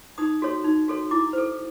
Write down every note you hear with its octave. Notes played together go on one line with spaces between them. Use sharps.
D#4 D#6
F#4 A4 C#5
D#4
F#4 A4 C#5
E4 D6
C5
A4